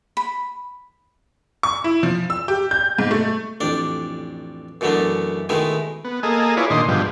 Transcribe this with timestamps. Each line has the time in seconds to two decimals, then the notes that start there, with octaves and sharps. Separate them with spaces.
0.17 B5
1.63 C#6
1.84 E4
2.03 F3
2.30 E6
2.48 G4
2.71 G6
2.98 G#2
3.11 A3
3.60 A1 F2 D4 D5
4.81 F#2 B2 E3 A3 B3 D4
5.49 B2 D#3 G#3 A3 D#4 E4
6.05 B3
6.23 A#3 G#4 A4 D#5
6.57 E4 F4 G#4 B4 C#5 D5
6.70 A#2 D#3 D4 D#5 C6
6.88 G#2 B2 D3 F3 G3